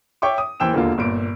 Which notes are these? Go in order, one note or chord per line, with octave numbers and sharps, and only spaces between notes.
C#5 E5 G5 C#6 D6
D#6
D#2 E3 C5 G5 E6 E7
E1 D#2 D3 A#3 F4
G1 A#2 D7